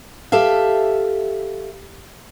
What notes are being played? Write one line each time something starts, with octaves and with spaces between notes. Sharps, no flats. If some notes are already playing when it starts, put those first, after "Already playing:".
G4 A4 E5 F5